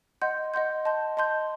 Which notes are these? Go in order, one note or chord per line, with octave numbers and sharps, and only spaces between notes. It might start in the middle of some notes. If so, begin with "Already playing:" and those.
D#5 F#5 C6 G6
D#5 F#5 C6 G6
D#5 A5 C6 G6
D#5 A5 C6 G6